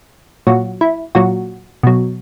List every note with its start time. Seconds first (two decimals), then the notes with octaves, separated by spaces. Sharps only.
0.47 A#2 F#3 F#4
0.81 E4
1.15 A#2 F#3 F#4
1.83 B2 F#3